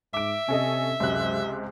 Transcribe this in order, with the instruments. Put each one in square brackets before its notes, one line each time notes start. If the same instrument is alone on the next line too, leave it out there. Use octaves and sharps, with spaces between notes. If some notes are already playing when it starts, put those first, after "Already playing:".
[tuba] G#2 [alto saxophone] E5 [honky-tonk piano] D6 D7
[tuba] C3 [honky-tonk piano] C#4 A4 D#5
[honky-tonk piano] C#2 C3 F#6 [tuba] F#2